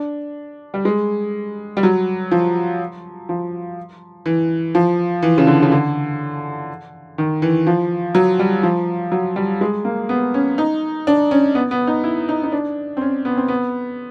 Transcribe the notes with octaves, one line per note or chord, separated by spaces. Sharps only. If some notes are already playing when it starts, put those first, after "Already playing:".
Already playing: D4
G3
G#3
G3
F#3
F3
F3
E3
F3
E3
C#3
D3
C#3
D3
D#3
E3
F3
F#3
G3
F3
F#3
G3
G#3
A#3
B3
C#4
D#4
D4
C#4
B3
B3
D#4
E4
D#4
D#4
D4
C4
C#4
B3
C4
B3